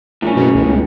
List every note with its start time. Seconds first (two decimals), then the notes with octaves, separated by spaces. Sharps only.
0.22 A#1 A2 C#3 C#4
0.36 F#1 B2
0.55 E1 C#2
0.69 G1